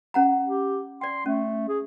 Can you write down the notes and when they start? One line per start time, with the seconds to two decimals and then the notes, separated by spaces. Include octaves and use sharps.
0.14 C#4 F#5 A#5
0.46 G4
1.01 D5 G5 C6
1.26 A3 C#4
1.68 G#4